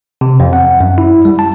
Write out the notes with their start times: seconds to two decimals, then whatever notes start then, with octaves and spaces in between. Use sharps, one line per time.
0.21 C3
0.40 F2
0.53 F#5
0.80 F#2
0.98 E4
1.25 G3
1.39 A5